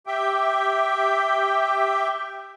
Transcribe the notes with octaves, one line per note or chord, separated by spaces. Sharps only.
G4 E5 G5